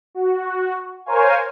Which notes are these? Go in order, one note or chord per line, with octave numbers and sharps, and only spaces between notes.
F#4
A#4 C5 C#5 F5 G#5